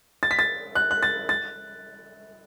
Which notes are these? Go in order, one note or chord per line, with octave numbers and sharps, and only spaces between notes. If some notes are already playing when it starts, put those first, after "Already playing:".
A6
B6
A6
F#6
F#6
A6
A6